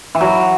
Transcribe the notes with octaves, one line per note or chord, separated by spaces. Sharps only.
E3
F#3